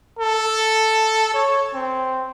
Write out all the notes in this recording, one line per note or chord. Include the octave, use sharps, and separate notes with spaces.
A4
C#5
C4